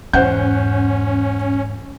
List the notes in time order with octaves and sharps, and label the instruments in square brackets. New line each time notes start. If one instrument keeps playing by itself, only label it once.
[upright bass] E2 G#2 [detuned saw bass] C#4 [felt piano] C5 F#5 G6